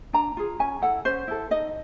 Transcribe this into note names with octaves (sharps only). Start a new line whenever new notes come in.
D4 A#5
F4 G#4
C#4 G#5
E4 A4 F#5
C#4 C5
E4 A4
D#4 D#5